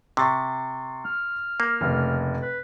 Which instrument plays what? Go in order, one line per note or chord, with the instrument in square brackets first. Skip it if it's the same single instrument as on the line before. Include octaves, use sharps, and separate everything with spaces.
[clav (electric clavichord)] C3 [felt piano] C6 C#6 A6
[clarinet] F6
[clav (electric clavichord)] A#3
[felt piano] F1 C#3 A3
[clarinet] B4